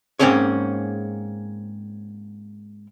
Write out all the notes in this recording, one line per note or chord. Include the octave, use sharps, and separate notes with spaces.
G#2 A#3 C4 C#4 G#4 C#5